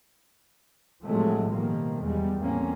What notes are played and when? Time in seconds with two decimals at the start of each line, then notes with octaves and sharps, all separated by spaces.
1.04 A2 C3 F3 F#3 G#3 A3
1.51 B2 D#3 F3 G3 A#3
2.02 E2 G3 G#3
2.38 E2 A2 A#3 C4 C#4